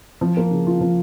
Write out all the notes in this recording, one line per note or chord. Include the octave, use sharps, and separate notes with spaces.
F3
A#3
C#3
F4
F3